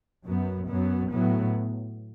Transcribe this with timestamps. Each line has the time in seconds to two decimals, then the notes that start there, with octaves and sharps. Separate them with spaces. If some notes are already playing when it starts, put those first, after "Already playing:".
0.24 F#2 F#3 B3
0.66 F#2 F#3 B3
1.10 A2 F#3 B3